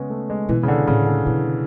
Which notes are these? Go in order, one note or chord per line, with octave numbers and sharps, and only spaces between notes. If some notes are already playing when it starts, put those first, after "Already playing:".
Already playing: C#3 G#3 B3 C#4
A3
G#3
B2 E3
C#3
D3
A2 C#3
D3
B2 E3